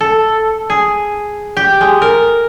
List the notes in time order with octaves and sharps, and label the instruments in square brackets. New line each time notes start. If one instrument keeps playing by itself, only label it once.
[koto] A4
G#4
G4
G#3
A#4